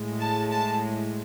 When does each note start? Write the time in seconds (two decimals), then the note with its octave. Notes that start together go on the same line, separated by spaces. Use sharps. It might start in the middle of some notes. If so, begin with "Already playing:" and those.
Already playing: A2 G#3
0.22 A5
0.52 A5